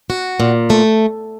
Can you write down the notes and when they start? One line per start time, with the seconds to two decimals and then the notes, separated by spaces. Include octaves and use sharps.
0.10 F#4
0.40 A#2
0.70 A3